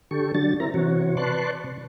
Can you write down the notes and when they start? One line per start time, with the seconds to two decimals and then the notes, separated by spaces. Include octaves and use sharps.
0.11 D3 G4 A4 C#6
0.35 D3 F#3 D4 A6
0.60 C4 E4 A#4 A#5
0.74 C3 E3 C4 F#4 C#5
1.17 B4 D5 A5 C6 C#6 F#6
1.64 C3